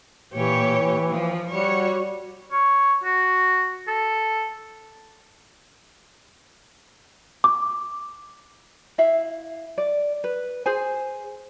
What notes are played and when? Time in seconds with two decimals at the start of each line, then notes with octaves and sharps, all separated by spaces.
0.34 A#2 E3 G4 C#5
1.08 F3
1.50 G3 F#4 C#5
2.52 C#5
3.04 F#4
3.88 A4
7.44 D6
8.98 E4 E5 F5
9.78 D5
10.24 B4
10.66 G#4 C5 G#5